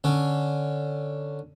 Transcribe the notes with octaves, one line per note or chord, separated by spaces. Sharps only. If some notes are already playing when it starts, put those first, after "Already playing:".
D3 C#4